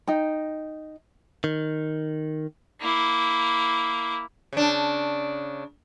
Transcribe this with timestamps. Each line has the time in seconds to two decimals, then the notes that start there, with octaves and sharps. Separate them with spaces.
0.07 D#4 G5
1.44 D#3
2.81 A#3 E4
4.53 C#3 D4